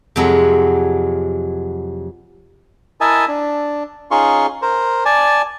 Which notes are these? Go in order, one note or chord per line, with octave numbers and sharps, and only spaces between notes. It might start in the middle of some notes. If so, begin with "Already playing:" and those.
F2 C3 F#3 G#3
E4 A#4 D#5 E5 G#5 A5
D4
C#4 D#4 F4 G#4 C6 C#6
A#4 C5
D5 G#5 A5